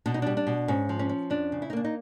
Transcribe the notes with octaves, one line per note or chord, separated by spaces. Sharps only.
B2 D4
D#4
G3 D4
D4
B2
G#2 C#4
F3
C#4
C#4
F2 D4
C#3
E4
D#4
A#3 D4
D#4